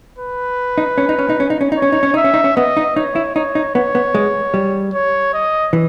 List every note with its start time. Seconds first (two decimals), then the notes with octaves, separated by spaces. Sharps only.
0.18 B4
0.78 D#4
0.98 C#4
1.09 D#4
1.19 C#4
1.30 D#4
1.40 C#4
1.50 D#4
1.61 C#4
1.72 D#4
1.77 C#5
1.82 C#4
1.92 D#4
2.03 C#4
2.14 D#4 E5
2.24 C#4
2.34 D#4
2.44 C#4
2.56 B3 D#5
2.77 D#4
2.96 D#4 C#5
3.16 E4
3.36 D#4 C#5
3.55 D#4
3.75 B3 C#5
3.95 B3
4.15 G#3
4.54 G3
4.94 C#5
5.33 D#5
5.73 E3